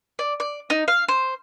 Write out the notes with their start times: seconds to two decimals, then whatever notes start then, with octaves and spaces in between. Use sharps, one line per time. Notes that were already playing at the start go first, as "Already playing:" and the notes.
0.19 D5
0.40 D5
0.70 D#4
0.88 F5
1.08 C5